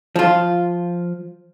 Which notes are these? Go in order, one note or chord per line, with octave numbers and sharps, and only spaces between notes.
F3 F4